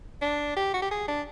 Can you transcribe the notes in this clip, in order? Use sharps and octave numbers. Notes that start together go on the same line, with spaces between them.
D4
G4
F#4
G4
G#4
D4